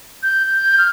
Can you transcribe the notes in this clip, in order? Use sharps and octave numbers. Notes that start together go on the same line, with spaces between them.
G6
G6
F6